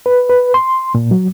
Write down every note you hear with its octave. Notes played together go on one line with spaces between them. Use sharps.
B4
B4
C6
A#2
F#3